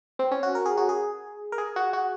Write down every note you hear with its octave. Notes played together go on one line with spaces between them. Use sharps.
C4
C#4
F#4
A#4
G#4
F#4
G#4
A#4
G#4
F#4
F#4